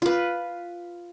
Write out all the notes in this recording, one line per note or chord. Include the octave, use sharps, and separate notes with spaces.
F4 B4